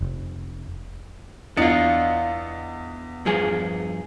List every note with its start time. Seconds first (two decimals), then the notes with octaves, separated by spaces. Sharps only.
0.01 F1
1.57 E2 D4 F4 D#5 C#7
3.25 G2 F3 G#4